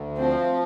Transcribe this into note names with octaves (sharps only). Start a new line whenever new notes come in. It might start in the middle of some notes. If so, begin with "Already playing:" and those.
Already playing: D2
F3 C4